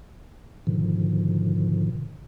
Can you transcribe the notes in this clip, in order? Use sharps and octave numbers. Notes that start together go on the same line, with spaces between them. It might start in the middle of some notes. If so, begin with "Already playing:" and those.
G#2 B2 D3 D#3 F3